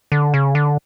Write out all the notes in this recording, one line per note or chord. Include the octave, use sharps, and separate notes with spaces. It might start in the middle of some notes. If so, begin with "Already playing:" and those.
D3
C#3
D3